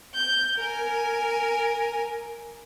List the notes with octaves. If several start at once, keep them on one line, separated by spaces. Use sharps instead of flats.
G6
A#4 G#5